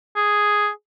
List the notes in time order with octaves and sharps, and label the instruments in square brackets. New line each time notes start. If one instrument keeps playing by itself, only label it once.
[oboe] G#4